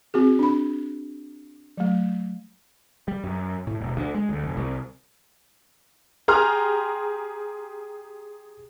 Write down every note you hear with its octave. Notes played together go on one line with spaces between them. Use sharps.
C4 F#4 G#4
D4 B5
F#3 A3
G3
F#2
A2
E1
D2
G#3
D2
F1
C2
G4 G#4 G5 A#5 C6 F6